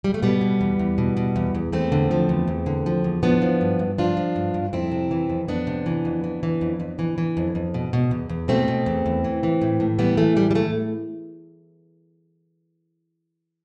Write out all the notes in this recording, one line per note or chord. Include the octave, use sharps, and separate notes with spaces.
G3
A3
B2 G3 B3
B2
E2
E2
B2
B2
E2
E2
E2 A3 C4
D3
F3
E2
E2
D3
F3
E2
F3 B3 D4
F3
G2
G2
F3 D4 F4
F3
G2
G2
F2 C4 E4
C3
E3
F2
F2 B3 D4
C3
E3
F2
E3
E3
F2
F2
E3
E3
F2
F2
B2
B2
E2
E2
B2 A3 C4
B2
E2
E2
E3
E3
A2
A2
E3 G3 B3
E3 A3
A2 G3
G3
A2 A3